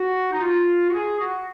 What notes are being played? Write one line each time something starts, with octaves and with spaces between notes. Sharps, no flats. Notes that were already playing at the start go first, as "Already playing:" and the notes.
Already playing: F#4
D#4
F4
F#4
G#4
F#4